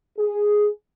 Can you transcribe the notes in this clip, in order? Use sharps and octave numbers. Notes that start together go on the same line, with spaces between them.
G#4